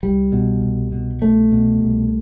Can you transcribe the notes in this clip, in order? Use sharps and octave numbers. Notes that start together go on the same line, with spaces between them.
C2 G3
B2
C2
B2
C2 A3
B2
C2